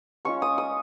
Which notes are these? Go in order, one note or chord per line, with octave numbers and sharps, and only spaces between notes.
G#3 C#4 F4 C#6
D#6
D#6